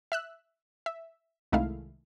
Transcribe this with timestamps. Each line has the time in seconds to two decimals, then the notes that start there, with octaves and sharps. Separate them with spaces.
0.12 E5 E6 F#6
0.86 E5
1.52 C2 D#3 G#3 A3 E4 F5